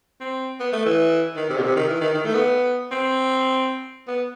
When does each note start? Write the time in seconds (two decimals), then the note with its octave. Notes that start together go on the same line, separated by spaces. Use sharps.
0.21 C4
0.60 B3
0.72 A3
0.85 E3
1.36 D#3
1.50 C3
1.57 B2
1.63 C3
1.76 D#3
1.88 E3
2.01 D#3
2.14 D#3
2.25 A3
2.34 B3
2.91 C4
4.08 B3